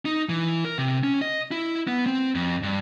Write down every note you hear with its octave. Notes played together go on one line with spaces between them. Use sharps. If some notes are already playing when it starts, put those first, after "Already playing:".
D#4
E3
A#4
C3
C#4
D#5
E4
B3
C4
F2
G2